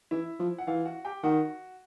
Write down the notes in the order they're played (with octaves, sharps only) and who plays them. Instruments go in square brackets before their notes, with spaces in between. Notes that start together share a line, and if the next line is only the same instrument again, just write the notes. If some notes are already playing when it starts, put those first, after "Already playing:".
[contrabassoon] E3 [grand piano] E4 E5
[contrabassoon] F3
[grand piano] F#5
[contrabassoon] E3 [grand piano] F4 F5
[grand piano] F#4 F#5
G4 G5
[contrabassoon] D#3 [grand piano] F#4 F#5